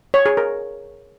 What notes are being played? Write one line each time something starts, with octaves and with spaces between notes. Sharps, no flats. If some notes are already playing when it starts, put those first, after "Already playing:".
C#5
G#4
A#4